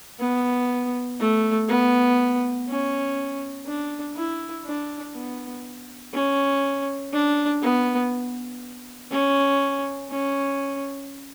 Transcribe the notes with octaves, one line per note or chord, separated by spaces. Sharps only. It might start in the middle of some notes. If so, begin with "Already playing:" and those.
B3
A3
B3
C#4
D4
E4
D4
B3
C#4
D4
B3
C#4
C#4